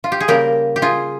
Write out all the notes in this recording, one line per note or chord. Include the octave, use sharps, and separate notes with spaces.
F4
G4
G#4
C#3 G3 A#3 G4 A#4
G4
F4 G#4